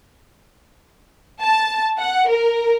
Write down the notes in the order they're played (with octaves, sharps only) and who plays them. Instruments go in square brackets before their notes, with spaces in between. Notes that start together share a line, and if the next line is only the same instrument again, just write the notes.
[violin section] A5
F#5
A#4